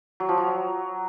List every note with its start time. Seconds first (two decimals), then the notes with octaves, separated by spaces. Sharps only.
0.20 F#3
0.29 F3
0.38 F#3